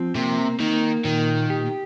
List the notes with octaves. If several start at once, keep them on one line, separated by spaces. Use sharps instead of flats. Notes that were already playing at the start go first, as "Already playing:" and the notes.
Already playing: F3 C4
C3 A#3
D#3 A#3
A#2 D#3
G4